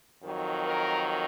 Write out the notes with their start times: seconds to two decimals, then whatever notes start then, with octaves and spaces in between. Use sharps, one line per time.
0.24 F2 D#3 F#3
0.65 A#4